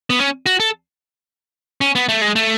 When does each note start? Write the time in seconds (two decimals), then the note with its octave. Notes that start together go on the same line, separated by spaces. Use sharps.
0.10 B3
0.19 C#4
0.46 F#4
0.60 A4
1.81 C#4
1.95 B3
2.09 A3
2.22 G#3
2.36 A3